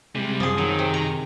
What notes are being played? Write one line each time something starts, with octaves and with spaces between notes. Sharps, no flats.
C3 G3 G#3
F#2 F3 G#4
D#3 F#3
C3
A#5